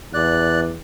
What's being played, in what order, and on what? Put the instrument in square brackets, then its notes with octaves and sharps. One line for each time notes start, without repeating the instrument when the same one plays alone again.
[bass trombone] E2 [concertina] D5 F#6